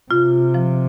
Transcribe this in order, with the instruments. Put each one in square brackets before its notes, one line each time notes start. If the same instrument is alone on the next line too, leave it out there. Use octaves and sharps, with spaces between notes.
[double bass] C3 [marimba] F4
[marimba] F3